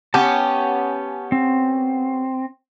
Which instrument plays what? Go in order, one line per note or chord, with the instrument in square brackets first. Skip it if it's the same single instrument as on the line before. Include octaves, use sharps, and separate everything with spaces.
[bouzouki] B3 C#4 G4 [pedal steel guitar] A5 G6
[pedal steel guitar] C4